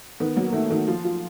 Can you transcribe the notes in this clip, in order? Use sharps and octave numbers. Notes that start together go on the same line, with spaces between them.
D#3 B3
F#3 A#3
D#3 A3
D#3
F3 F4
F4